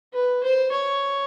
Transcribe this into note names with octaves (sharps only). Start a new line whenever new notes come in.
B4
C5
C#5